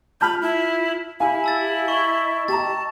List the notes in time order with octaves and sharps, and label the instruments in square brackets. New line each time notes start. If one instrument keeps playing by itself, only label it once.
[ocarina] F4 [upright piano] A5 F6 G6 [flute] B5
[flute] E4
[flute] E4 [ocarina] G4 [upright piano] F5 G#5
[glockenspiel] A5 E6 A6
[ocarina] D#5 [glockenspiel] C#6
[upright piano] G4 A#5 [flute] A5 [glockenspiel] A6